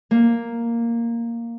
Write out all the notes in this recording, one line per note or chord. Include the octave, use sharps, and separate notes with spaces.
A#3